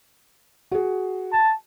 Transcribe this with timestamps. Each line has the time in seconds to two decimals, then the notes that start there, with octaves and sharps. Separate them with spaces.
0.72 F#4 G#4
1.33 A5